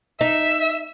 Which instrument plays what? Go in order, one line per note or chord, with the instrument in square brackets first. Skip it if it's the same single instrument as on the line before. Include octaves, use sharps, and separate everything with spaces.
[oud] D#4 [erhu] E5